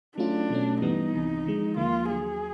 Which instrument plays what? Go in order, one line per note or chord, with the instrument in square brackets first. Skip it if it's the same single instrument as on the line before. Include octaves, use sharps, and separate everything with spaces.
[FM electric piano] F#3 A3 C#4 F4 [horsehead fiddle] D4
[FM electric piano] B2 F#3 A3 C#4
[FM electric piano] G2 E3 G3 B3 [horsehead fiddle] D#4
[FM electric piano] C2 C3 E3
D3 F3 G#3
[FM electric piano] D#2 D3 F3 A#3 [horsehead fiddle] F4
[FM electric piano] D#2 D3 F#3 [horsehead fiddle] G#4